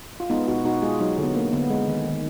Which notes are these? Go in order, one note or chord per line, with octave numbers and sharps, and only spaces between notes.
F4
G#3 B3 D#4
B2 D#4 F#4
B2 D#4 F#4
G#3 F4 G#4
F#3 D#4 F#4
D3
B3
A#3
D3 B3
G#3
D#3
D#3